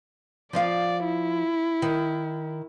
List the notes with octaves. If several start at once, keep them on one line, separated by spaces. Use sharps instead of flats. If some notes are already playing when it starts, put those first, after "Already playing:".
F3 F4 D5 F5
E4
D#3